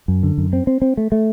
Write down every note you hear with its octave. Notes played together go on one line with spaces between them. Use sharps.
F#2
D3
F#2
C4
C4
C4
A3
A3